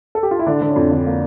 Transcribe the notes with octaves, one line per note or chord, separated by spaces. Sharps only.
A4
G4
F4
E4
D3 D4
D3
C#4
F2
D3 D4
A#3